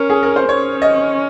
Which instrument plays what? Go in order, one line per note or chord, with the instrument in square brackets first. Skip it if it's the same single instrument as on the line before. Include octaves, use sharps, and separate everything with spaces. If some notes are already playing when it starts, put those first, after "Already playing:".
Already playing: [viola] C#4 [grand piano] A#4
[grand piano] G#4
A#4
C5
[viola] C#4 [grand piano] C#5
[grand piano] D#5